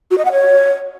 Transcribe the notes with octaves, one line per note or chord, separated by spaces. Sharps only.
F#4
D#5
F#5
C#5